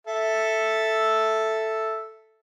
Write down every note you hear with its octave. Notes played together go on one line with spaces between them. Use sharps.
A4 E5